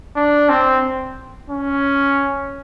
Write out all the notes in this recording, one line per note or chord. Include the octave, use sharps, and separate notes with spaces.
D4
C4
C#4